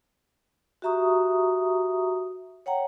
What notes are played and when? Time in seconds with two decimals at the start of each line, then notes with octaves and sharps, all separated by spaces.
0.82 F#4 G4 E5 A#5 C#6 D#6
2.66 C#5 F#5 G5 A#5